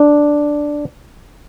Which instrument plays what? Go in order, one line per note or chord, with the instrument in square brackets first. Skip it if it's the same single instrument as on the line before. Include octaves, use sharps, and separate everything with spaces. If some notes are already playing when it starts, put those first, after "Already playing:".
Already playing: [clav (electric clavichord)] D4